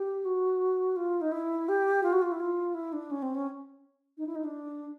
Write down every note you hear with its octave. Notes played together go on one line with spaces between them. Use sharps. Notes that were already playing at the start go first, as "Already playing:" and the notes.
Already playing: G4
F#4
F4
D#4
E4
G4
F4
F#4
F4
E4
F4
E4
D4
C#4
C4
C#4
D#4
E4
D#4
D4